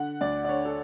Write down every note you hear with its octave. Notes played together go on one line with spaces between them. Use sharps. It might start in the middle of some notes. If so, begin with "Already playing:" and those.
Already playing: D3 F#5
D2 D5
D5
D3 C#5
A4